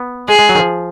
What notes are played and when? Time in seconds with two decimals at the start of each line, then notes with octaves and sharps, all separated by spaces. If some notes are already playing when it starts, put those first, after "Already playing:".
Already playing: B3
0.28 G#3 G#4
0.39 G#3
0.49 F#3
0.55 D#3
0.59 F3